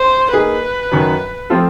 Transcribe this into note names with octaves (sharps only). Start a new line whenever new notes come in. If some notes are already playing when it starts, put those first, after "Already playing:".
Already playing: C5
A#3 D#4 G#4 B4
F#2 D#3 F#3
F3 A3 C4 F4 A4